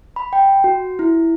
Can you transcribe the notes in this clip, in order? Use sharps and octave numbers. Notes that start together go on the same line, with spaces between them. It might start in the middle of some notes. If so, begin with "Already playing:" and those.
B5
G5
F#4
E4